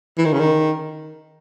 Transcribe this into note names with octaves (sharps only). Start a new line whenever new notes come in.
E3
D#3
C#3
D#3